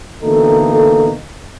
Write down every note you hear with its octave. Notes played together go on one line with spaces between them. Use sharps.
B2 D3 E3 A#3 D#4 A4